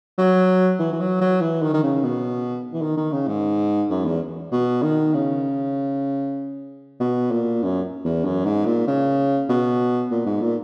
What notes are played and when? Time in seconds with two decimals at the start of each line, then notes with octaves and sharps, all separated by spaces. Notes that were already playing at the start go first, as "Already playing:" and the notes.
0.18 F#3
0.80 E3
0.92 E3
1.00 F#3
1.21 F#3
1.41 E3
1.62 D#3
1.73 D#3
1.83 C#3
2.04 B2
2.73 E3
2.82 D#3
2.97 D#3
3.12 C#3
3.27 G#2
3.90 F#2
4.05 E2
4.52 B2
4.82 D#3
5.14 C#3
7.00 B2
7.31 A#2
7.63 F#2
8.04 E2
8.25 F#2
8.45 G#2
8.65 A#2
8.87 C#3
9.49 B2
10.11 A#2
10.26 G#2
10.41 A#2